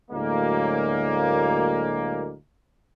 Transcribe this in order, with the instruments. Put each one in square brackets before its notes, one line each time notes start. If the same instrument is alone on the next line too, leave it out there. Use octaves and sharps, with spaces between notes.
[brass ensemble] D2 A2 F#3 G#3 A#3